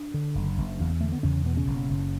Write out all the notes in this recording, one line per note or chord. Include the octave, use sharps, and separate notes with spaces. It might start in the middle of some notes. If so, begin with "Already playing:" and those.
Already playing: D4
D3
F#1
F#1
E2
D3 A3
B3
E2 C#3 C#4
B2 B3
C#3 C#4
F#1
F#1